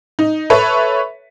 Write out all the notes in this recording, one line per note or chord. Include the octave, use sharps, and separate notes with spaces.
D#4
A4 B4 C#5 E5